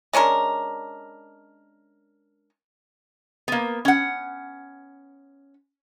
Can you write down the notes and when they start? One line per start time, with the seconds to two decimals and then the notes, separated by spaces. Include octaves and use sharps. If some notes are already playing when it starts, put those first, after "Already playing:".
0.13 G#3 C#4 D4 A#4
3.48 A#3 B3
3.85 C#4 F#5